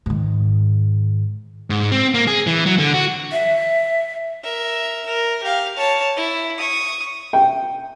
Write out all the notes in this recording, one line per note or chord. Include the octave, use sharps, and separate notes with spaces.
G#2 D#3
G#2
C4
A#3
G#4
E3
F#3
D3
F#4
E5
A#4 E5
A#4
G4 F5
C#5 A5
E4
C#6 D#6
G5